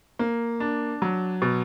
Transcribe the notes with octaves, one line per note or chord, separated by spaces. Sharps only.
A#3
D4
F#3
B2